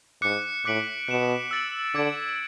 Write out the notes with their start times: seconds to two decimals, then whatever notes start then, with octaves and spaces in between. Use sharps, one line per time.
0.22 G#2 D6 F#6 C#7
0.65 A2 D6 F#6 B6 D7 F#7
1.08 B2 F#6 C#7 E7
1.51 E6 A6 D7 F#7
1.95 D3 D6 G#6 D7